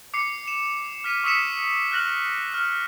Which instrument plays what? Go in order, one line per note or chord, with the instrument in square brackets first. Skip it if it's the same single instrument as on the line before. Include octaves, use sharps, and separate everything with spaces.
[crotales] D6 C7 C#7
E7
F6 B6 D#7 E7
C#6 D#6 E6 B6 C#7 E7
F6 F#6 A#6 F#7
F6